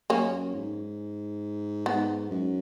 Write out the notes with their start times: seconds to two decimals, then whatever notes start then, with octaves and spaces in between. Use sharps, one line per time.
0.10 F#2 A#3 C#4
0.54 G#2
1.86 G#2 B3
2.31 F#2